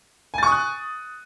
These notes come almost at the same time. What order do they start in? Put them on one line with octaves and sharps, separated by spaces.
G#5 A6 C#6 D#6 F#6